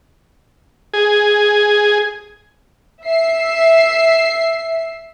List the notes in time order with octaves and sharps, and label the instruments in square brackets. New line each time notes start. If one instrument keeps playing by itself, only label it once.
[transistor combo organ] G#4
[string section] E5 C7